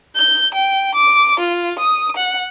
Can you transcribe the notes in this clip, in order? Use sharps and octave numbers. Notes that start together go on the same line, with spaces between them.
G6
G5
D6
F4
D#6
F#5